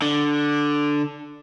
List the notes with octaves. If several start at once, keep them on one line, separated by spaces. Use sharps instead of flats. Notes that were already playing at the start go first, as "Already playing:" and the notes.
D3